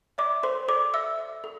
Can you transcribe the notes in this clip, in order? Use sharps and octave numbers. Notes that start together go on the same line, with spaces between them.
D5 E5 D6
A4 C5 C6
A4 D5 D6
E5 E6
E5
A4